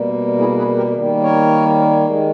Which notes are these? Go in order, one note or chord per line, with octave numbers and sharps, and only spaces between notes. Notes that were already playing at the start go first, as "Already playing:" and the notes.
Already playing: B2 G3 A#3
E4 G#4
G#4 B4
G4 A#4
D#3 G3 A#3
A#4 C#5
D#3 G#3